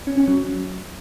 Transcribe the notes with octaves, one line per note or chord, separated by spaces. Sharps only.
C#4
C#4
F#3